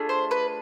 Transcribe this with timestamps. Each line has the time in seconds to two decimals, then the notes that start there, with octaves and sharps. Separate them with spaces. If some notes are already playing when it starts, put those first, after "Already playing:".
Already playing: A3 D4 F4 G#4
0.09 C5
0.31 B4